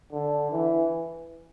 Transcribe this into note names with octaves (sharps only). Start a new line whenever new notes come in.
D3
E3